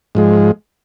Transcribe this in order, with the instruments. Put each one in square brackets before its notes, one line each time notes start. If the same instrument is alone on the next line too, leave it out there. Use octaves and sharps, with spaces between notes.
[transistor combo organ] G#2 F3 G#3